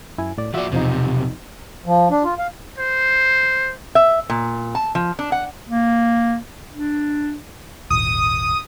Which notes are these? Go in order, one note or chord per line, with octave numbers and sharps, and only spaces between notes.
F#2 E4 G#5
A2 D5
F3 F#4 D5 E5
B1 E2 C3 F3 D#4
F3
D4
F4
F5
C5
E5
A#2
A5
F3
D4
F#5
A#3
D4
D#1 G#1 D#6